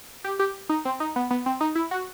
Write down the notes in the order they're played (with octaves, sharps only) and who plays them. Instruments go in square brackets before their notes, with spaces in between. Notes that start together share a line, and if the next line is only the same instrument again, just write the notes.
[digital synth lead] G4
G4
D#4
C4
D#4
B3
B3
C4
D#4
E4
F#4